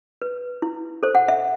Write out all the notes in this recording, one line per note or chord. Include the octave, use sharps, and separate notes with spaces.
B4
E4
A4 C5
F#5
E5